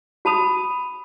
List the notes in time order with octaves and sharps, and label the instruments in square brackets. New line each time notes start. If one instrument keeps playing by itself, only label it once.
[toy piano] F#4 A5 B5 D#6